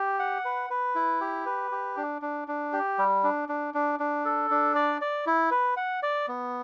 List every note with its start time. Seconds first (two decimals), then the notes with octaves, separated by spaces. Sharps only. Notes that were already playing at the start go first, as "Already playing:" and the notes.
Already playing: G4
0.19 F#5
0.45 B4
0.70 B4
0.95 E4
1.21 G4
1.46 B4
1.71 G4
1.97 D4
2.22 D4
2.48 D4
2.73 G4
2.98 G3
3.24 D4
3.49 D4
3.74 D4
4.00 D4
4.25 A4
4.51 D4
4.75 D5
5.01 D5
5.26 E4
5.51 B4
5.77 F#5
6.03 D5
6.28 B3